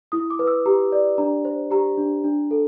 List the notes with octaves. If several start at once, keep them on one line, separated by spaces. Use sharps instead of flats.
E4 D#6
D6
B4
E6
G4 A#5
D5
D4 A#5
C5
G4 A#5
D4
D4
A4